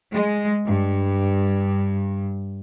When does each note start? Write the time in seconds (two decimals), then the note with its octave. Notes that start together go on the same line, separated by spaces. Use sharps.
0.12 G#3
0.66 G2